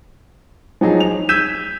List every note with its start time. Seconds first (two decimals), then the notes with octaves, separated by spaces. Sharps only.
0.81 F3 F#3 D#4 G#4
1.00 F7
1.29 E6 G6 G#6 B6 D#7 E7